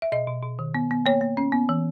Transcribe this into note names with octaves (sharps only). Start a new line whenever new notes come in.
E5
B2 D#5
B2
B2
D#3
B3
B3
A#3 C#5
A#3
C#4
B3
E3